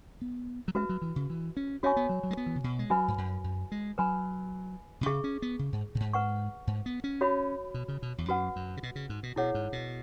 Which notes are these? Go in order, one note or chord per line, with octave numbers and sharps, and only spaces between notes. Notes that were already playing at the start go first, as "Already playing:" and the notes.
B3
F#3
G#3 F#4 B4 E5
F#3
E3
C#3
E3
C#4
C#4 F#4 C#5 E5 G#5 C#6
B3
F#3
F#3
G#3
B3
E3
C#3
B2
G#3
F#3 F#4 B4 E5 G#5 B5
G#2
F#2
F#2
G#3
F#3 B4 G#5 B5
B2
C#3 G#4 E5 C#6
C#4
B3
C#3
G#2
B2
G#2
B4 F#5 C#6
G#2
B3
C#4
F#4 C#5 E5 B5
B2
C#3
B2
E2
F#2 F#4 B4 F#5
F#2
C#3
B2
C#3
G#2
B2
B2 E4 G#4 C#5 F#5
G#2
B2